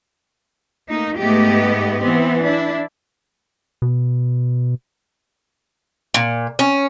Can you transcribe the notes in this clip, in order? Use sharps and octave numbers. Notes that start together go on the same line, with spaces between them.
A3 A#3 D#4
G#2 A3 B3 G4 D#5
E3 B3 C4
D4 E4
B2
A#2
C#4